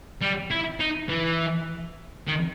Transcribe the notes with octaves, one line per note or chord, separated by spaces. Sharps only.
G3
E4
D#4
E3
D#3